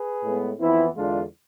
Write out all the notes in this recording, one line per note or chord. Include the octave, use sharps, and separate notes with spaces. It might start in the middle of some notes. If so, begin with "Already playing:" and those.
Already playing: G#4 B4
A2 G#3 B3
F2 E3 B3 C4 E4
E2 D3 G#3 D4 F4